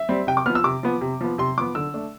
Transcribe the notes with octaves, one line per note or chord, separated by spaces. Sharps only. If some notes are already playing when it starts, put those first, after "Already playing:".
Already playing: E5
G3 C4
C3 G5
D6
F3 B3 F6
E6
C3 D6
F3 B3
C3
F3 B3
C3 C6
F3 B3 D6
D3 E6
A3 D4